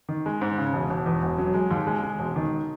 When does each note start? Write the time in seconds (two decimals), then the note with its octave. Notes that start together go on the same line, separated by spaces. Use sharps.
0.09 D#3
0.26 G#3
0.41 G#2
0.58 C#3
0.73 E1
0.90 E1
1.06 E2
1.22 E1
1.38 F#3
1.54 G#3
1.71 D#2
1.87 G#3
2.03 G#3
2.19 E1
2.36 D#3